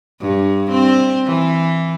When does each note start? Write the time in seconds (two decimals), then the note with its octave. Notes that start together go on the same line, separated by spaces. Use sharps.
0.21 G2
0.71 C4
1.27 E3